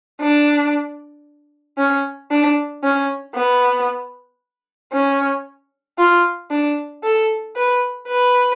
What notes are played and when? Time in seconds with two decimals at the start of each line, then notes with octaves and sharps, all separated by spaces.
0.21 D4
1.78 C#4
2.31 D4
2.83 C#4
3.35 B3
4.93 C#4
5.98 F4
6.51 D4
7.03 A4
7.56 B4
8.08 B4